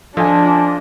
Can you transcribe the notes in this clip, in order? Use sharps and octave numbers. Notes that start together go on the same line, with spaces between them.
F3 D4 F4 A4 D#5 G#5